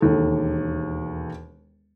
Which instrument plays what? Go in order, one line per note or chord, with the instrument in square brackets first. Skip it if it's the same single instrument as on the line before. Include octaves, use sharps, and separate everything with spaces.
[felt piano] E1 D#2 A4